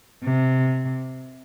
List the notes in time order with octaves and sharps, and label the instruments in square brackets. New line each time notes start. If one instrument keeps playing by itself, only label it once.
[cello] C3